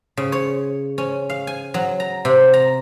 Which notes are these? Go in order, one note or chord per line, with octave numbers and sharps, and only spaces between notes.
C#3
C#5
C#4
F5
G#5
F#3
A#5
C3
A#5